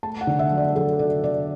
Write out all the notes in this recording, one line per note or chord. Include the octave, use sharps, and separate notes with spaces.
A3 A5
F#5
D3
E5
F#3
D5
F#3 A4
D3 D5
D3 D5